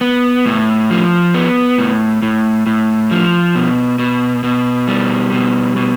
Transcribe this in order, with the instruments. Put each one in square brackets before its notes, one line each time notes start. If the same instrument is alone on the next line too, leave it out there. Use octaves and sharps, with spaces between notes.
[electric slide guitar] B3
A2
F3
B3
A2
A2
A2
F3
B2
B2
B2
G3
B2
B2